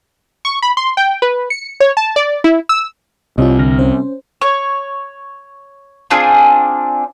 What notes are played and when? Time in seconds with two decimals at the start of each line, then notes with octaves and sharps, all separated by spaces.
0.45 C#6
0.62 B5
0.77 C6
0.97 G5
1.22 B4
1.50 C#7
1.80 C#5
1.97 A5
2.16 D5
2.44 E4
2.69 E6
3.38 C2 C3 F4 C#5 D#5
3.59 D3 F6 A#6
3.79 C#4 C5
4.41 C#5
6.10 C4 D4 F4 G#4